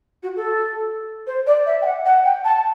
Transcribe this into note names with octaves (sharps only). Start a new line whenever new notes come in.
F#4
A4
C5
D5
E5
G5
F#5
F#5
G5
A5